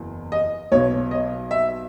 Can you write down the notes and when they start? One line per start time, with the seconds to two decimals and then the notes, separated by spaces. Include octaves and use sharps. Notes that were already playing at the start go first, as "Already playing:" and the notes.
Already playing: F#1 E2
0.32 D#5
0.72 B1 B2 C#5
1.11 D#5
1.51 E5